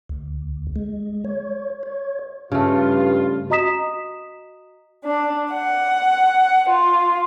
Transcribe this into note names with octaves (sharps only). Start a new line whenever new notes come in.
D2
G#3
C#5
C#5
G2 C#3 A3 F4
F#4 D#5 A#5 D#6 B6 E7
D4
F#5
F4